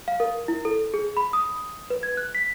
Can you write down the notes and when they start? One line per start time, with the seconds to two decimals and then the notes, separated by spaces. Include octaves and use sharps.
0.08 F5
0.20 A#4
0.48 E4
0.65 A4
0.94 G#4
1.17 B5
1.33 D#6
1.90 B4
2.03 G#6
2.17 F#6
2.35 B6